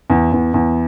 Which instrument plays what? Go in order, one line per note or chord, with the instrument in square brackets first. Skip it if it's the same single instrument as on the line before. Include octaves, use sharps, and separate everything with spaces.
[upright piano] E2
E2
E2